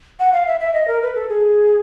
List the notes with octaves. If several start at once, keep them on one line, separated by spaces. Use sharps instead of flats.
F#5
F5
E5
E5
D#5
A#4
B4
A4
G#4